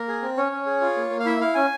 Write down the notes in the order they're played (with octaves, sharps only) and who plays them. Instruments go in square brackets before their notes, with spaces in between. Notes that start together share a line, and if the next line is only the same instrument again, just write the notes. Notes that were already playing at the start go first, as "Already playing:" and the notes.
Already playing: [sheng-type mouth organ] A#3 A#4
G#4
C4
C#4 C#5
C#4
G#4
F4
A#3
A#3
F5
E4 E5
E4 F5
C#4 G#5